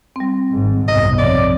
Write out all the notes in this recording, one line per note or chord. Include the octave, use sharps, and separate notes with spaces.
G3 C4
G#1 G#2
B1 F#2 C3 D#5
F3 C4 C#5 D5